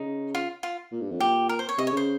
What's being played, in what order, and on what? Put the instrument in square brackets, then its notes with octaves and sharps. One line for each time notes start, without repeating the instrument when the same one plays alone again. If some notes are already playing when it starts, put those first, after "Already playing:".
Already playing: [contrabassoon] C#3 [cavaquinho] D#4
[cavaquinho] F4
F4
[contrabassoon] A#2
G2
F2
[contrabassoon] A#2 [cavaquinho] G4
[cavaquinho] A#4
C5
C#5
[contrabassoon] C3 [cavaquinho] D#5
[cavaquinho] C#5
[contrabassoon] C#3 [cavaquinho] C5